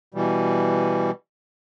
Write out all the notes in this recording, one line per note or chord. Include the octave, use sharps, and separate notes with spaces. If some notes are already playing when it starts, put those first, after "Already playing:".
B2 E3 G3